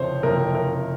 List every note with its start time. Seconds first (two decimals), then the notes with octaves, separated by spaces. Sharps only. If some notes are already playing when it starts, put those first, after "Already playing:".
Already playing: F#1 F2 C3 C5 C#5
0.23 F#1 F2 C3 A#4
0.55 A#4